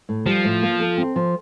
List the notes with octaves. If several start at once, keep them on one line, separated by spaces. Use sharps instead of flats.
A2
F3 G3
A2
A#3
A4
C4
F3